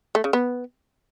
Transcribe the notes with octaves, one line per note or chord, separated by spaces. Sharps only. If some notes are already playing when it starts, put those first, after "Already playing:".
A3
C#3
B3